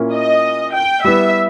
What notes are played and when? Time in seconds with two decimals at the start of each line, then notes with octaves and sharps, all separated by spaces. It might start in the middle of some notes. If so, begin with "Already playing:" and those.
Already playing: A#2 A#3 C#4 E4
0.13 D#5
0.74 G5
1.04 G3 B3 E4 E5